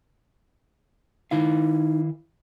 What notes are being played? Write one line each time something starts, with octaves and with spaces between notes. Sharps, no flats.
D#3 D#4 E4 F5